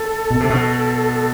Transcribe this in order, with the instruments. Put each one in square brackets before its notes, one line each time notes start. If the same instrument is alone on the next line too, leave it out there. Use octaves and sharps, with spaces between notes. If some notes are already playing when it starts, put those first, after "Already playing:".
Already playing: [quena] A4
[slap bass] B2
C3
B2